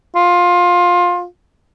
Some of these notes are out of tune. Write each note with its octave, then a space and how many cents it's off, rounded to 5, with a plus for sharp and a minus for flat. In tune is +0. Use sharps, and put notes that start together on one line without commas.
F4 +20